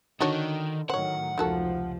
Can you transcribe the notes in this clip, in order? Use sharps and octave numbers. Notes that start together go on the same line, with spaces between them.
D3 D#3 D4 D#4 F#4 C#5
A2 D#3 F#3 C5 C#5 F#5
F1 C#2 D#3 F3 F#4 A4